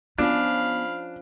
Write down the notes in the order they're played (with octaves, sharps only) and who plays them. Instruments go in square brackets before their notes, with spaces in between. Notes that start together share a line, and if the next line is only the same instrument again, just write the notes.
[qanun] F3 C#4 [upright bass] B3 [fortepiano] D4 [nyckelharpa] F5 B5